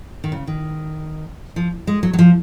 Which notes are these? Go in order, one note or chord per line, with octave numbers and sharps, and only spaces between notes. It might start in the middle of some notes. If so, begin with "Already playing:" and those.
D#3
C#3
D#3
F3
G#3
F#3
F#3
F3